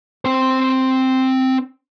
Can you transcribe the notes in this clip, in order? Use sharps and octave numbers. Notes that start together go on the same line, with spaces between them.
C4 C5